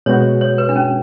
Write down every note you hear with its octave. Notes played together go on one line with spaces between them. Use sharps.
B2 G#3 B3 F#4 C#5
C#5
B4
D4
C#4